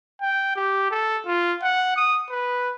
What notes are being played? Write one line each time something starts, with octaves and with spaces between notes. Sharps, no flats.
G5
G4
A4
F4
F#5
D#6
B4